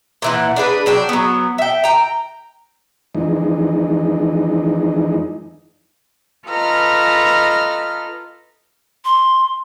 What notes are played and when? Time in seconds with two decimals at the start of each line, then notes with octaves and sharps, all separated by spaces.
0.22 A#2 E3 F#5
0.56 D4 G#4 B4
0.86 F#3 D4 G5
1.09 F#3 B3
1.58 E5 G5
1.84 G5 A#5
3.15 F2 D#3 E3 G#3 D4 D#4
6.49 F4 A4 B4 D#5 A#5 F6
9.05 C6